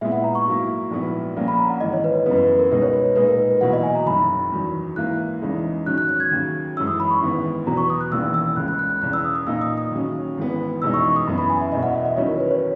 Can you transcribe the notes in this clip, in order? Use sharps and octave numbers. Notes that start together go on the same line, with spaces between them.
A#2 G#3 B3 E4 E5
F#5
A#5
C#6
G#2 F#3 A#3 E4
A#1 G#2 F#3 B3 E4
A#1 A#2 A#3 C#4
B5
A#5
F#5
G#1 G#2 E3 D#5
C#5
B4
D#5
F#2 C#3 E3 B3 B4
B4
B4
A#4
C#2 B2 G#3 D#4 B4
C#5
B4
B4
A#2 G#3 D#4 B4
A#4
B4
B4
E2 B2 F#3 A#3 E4 F#5
D#5
G#5
A#5
F#1 F#2 D#3 B5
E2 D#3 F#3
G#2 E3 A#3 E4 F#6
E2 C#3 E3 G#3 D#4
G#2 D#3 F#3 C#4 F#6
F#6
F#6
G#6
D#2 C#3 F#3
F#2 E3 G#3 C#4 E6
D#6
B5
C#6
G#1 G#2 E3 B3
E2 B2 F#3 B3 A#5
C#6
D#6
F#6
E1 D#2 C#3 E3 A#3 E6
E6
C#2 C#3 G#3 C#4 F#6
F#6
F#6
F#6
E1 E2 C#3 F#6
E6
D#6
D#6
A#2 A#3 D#4 E6
D#6
D#6
D#2 C#3 F#3 C#4
G#1 G#2 E3 B3
F#1 E2 B2 G#3 D#4 E6
C#6
C#6
D#6
F#2 E3 B3
B5
G#5
E5
E1 E2 B2 D#5
F#5
E5
D#5
D#2 D#3 F#3 C#4 E4 C#5
A#4
B4
C#5